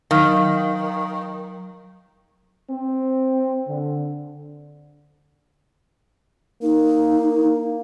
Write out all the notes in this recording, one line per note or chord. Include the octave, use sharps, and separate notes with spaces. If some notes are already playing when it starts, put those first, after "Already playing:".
D#3 F#3 F5 F6
C4
D3
A#3 D#4